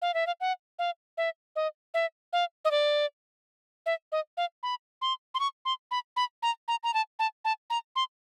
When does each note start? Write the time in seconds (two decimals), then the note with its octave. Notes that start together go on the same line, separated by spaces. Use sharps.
0.02 F5
0.14 E5
0.27 F5
0.41 F#5
0.79 F5
1.18 E5
1.56 D#5
1.94 E5
2.33 F5
2.65 D#5
2.71 D5
3.86 E5
4.12 D#5
4.37 F5
4.63 B5
5.02 C6
5.34 C6
5.40 C#6
5.65 C6
5.91 B5
6.16 B5
6.43 A#5
6.68 A#5
6.83 A#5
6.94 A5
7.19 A5
7.45 A5
7.70 A#5
7.96 C6